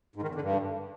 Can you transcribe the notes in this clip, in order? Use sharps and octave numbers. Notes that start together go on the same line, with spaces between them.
G#2
D#3
E2
D3
G2